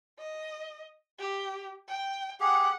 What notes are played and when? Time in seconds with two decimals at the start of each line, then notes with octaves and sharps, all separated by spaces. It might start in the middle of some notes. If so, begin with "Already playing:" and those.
0.19 D#5
1.19 G4
1.88 G5
2.40 G4 G#4 F#5